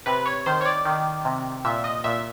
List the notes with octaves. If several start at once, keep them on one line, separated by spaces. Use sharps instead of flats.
C3 B4
C#5
D#3 C5
C#5
D5
D#3
C3
A#2 E5
D#5
A#2 E5